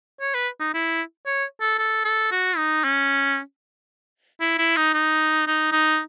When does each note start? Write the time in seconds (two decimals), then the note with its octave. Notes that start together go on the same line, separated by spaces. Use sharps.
0.21 C#5
0.34 B4
0.60 D#4
0.74 E4
1.26 C#5
1.61 A4
1.79 A4
2.05 A4
2.32 F#4
2.57 D#4
2.84 C#4
4.41 E4
4.59 E4
4.77 D#4
4.94 D#4
5.47 D#4
5.72 D#4